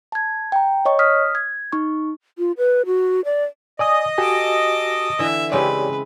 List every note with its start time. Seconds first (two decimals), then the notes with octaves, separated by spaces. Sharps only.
0.12 A5 G#6
0.52 G5 A#5
0.85 C#5 D#5 C#6
0.99 D#6 F6 B6
1.35 G#6
1.72 D#4 C#6
2.38 F4
2.57 B4
2.86 F#4
3.25 D5
3.79 D5 D#5 G#5 D#6
4.18 F#4 G4 A4 G#5 D6
5.19 D3 E3 E5
5.52 C#3 G#3 C4 G4 B4 C#5 D5